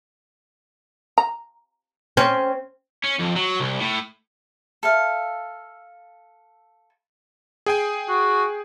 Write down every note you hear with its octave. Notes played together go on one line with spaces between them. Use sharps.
A#5
C4 C#4
C#4
F2
F#3
C2
A2
A4 E5 F5
G#4 G5 G#5
F#4